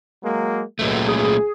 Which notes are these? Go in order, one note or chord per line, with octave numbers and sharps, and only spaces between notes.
F#3 G#3 A#3
C#2 A#2 F#3 A3
G#4